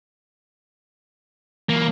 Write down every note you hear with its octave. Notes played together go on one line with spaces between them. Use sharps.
E3 F#3 A#3